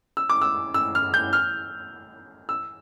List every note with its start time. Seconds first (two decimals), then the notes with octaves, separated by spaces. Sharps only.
0.17 E6
0.30 D6
0.42 E6
0.74 E6
0.95 F6
1.14 G6
1.33 F6
2.49 E6